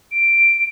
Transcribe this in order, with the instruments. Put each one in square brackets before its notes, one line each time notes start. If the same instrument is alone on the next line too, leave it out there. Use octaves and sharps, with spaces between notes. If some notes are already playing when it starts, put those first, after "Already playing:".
[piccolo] D7